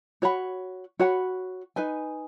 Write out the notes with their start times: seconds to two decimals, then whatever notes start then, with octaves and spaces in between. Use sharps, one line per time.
0.22 F#4 C#5 F#5 B5
0.99 F#4 C#5 F#5 B5
1.76 D#4 B4 G#5